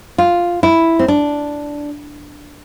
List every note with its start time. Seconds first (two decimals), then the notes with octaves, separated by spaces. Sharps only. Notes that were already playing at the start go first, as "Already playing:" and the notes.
0.18 F4
0.63 E4
0.99 C4
1.08 D4